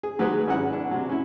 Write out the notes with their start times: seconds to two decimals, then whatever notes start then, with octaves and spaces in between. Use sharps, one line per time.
0.03 G#4
0.19 D#3 F#3 G#3 G4 G#4 B4
0.47 G#1 C#4 E4 F#5
0.73 D4
0.91 C3 F#3
1.09 C#4 E4